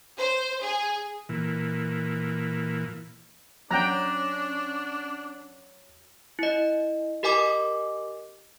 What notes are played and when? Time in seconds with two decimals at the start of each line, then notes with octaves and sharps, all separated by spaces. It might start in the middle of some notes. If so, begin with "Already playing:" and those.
0.18 C5
0.62 G#4
1.29 A#2 E3
3.71 F#3 C#4 D4 G5 A#5 F#6 A#6
6.39 E4 D#5
7.23 G4 A#4 D#5 G#5 D6